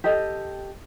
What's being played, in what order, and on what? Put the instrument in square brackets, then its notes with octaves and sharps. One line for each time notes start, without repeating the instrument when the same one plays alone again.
[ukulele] G4 A4 D#5